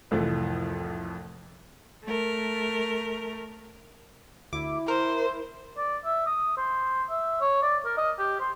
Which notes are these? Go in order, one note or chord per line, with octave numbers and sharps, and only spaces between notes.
C2 F2 A2 E3 F3 A3
A3 A#4
D2 E4 D6
A#4 C5
D5
E5
D#6
C5
E5
C#5
D5
A#4
D#5
G4
C5